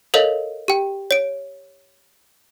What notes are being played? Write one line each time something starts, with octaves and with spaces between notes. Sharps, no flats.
A4 A#4 C#5 D#5 F5
G4 G5
C#5 D7